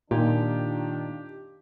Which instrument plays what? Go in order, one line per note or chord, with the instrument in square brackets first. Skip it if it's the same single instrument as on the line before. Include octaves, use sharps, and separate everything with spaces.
[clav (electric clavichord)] A#2 [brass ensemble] D#3 D4 [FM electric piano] D#4 F4 [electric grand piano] G4